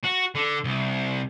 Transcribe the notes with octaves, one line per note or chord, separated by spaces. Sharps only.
F#4
D3
C2